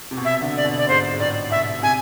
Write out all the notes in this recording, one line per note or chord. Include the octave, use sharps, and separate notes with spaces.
C3
B2
E5
D3
D5
B2
D5
G#2 C5
G#2
A2 D5
B2 E5
C3 G#5